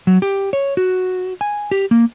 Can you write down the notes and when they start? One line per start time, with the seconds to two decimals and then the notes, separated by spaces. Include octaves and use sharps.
0.07 F#3
0.22 G4
0.53 C#5
0.77 F#4
1.41 G#5
1.71 G4
1.91 A#3